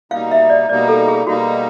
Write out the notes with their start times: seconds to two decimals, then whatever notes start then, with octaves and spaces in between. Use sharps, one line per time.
0.11 B2 G3 A#3 D#4 F5
0.31 E5
0.50 D5
0.69 B2 G3 A#3 D#4 D5
0.88 A4
1.08 G#4
1.27 B2 G3 A#3 D#4 F#4